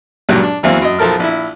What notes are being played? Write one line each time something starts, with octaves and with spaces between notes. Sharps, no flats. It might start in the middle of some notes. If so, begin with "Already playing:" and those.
C#2 G2 A#2 F#3 G4 F#6
D4
E2 E3 F#3 A#3 C4
F#2 D#5
B1 F3 A4 A#4 F6
A#1 E4